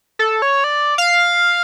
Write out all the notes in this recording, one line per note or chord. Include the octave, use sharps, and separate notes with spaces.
A4
C#5
D5
F5